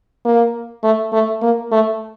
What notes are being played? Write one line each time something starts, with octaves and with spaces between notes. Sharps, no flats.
A#3
A3
A3
A#3
A3